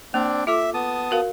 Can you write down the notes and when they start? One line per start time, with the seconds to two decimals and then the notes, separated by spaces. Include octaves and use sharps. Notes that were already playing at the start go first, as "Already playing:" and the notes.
0.14 A#3 C4 D4 D5
0.47 F4 A4 E5 D6
0.74 B3 A5 D#6
1.11 F#4 A#4 F5